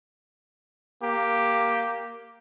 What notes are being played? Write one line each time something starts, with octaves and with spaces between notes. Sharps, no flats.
A#3 G4